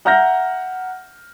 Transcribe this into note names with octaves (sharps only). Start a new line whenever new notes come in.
E5 F#5 A#5 F6 G6 A#6